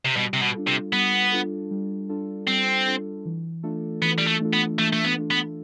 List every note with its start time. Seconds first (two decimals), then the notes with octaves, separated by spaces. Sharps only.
0.05 C3
0.16 B2 G3
0.34 C3
0.42 B2
0.54 D4 F4 A4
0.67 C3
0.93 G3 B3
1.32 D4 F4 A4
1.71 G3
2.09 D4 F4 A4
2.48 G3 C4
2.87 D4 F4 A4
3.26 E3
3.63 A3 D4 F4 A4
4.02 E3 B3
4.18 G3
4.27 A3
4.40 A3 D4 F4 A4
4.53 B3
4.79 E3 A3
4.93 A3
5.04 B3
5.18 A3 D4 F4 A4
5.31 B3